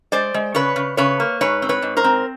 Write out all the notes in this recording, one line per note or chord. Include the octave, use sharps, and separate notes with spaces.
G#3 C5 D5
G#3
C#3 B4 C#5
C#3
C#3 B4 C#5
A#3
G#2 B4 C#5
C4
B4 C#5
G#2
A#4 C5
C4